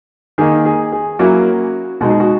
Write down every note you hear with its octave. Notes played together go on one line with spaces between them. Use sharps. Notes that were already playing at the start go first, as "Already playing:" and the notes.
D#3 A#3 D#4 G#4
G#4
G#4
F#3 A#3 C#4 E4 F#4
B2 G#3 D#4 F#4
G#4
F#4